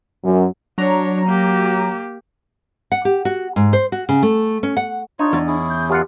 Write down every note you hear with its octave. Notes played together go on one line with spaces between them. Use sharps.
F#2
F#3 D4 C#5 A#5
A#3 G4
F#5
G4
F#4
G#2
C5
F#4
C#3
A3
C#4
F#5
D4 D#4 F4 C#5
E2
C#4 E4 G#4
G6
F#2 F4 G4 F#5